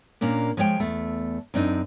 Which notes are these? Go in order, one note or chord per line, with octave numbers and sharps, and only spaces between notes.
A#2 A#3 C#4 D4
F3 G#3 C#5 F5 G5
E2 A3
F#2 C4 D4 D#4